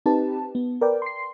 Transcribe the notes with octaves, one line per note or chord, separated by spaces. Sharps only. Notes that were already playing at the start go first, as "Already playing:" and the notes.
C4 D#4 G4 B4 A5
B3
A#4 B4 D5 G5
C6 C7